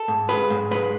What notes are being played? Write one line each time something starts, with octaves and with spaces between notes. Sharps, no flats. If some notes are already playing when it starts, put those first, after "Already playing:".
Already playing: A4
G#2
G#3 B4
G#2
G#3 B4